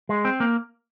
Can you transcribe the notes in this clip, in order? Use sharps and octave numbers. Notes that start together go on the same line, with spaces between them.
G#3
C4
A#3